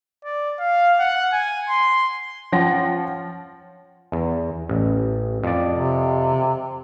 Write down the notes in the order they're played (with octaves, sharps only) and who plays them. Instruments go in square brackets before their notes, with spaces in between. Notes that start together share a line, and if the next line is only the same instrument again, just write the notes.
[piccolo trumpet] D5
F5
F#5
G#5
C6
[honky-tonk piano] F3 C#4 F#5 G5 C6 A#6
[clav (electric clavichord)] E2
A1
F2 D5
[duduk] C3